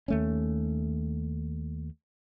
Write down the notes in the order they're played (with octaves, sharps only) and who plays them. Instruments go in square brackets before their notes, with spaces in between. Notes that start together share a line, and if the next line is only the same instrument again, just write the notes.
[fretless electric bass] D#2 A3 C#4